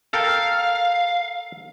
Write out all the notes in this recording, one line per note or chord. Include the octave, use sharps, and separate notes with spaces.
A4 A#4 F5 G5